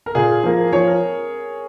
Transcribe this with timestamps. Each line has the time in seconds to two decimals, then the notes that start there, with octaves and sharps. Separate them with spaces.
0.06 A#4
0.15 A#2 G#4
0.44 F3 A#3
0.73 F3 C#5
0.87 A#4